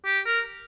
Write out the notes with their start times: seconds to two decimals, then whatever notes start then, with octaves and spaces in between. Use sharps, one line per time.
0.05 G4
0.26 A#4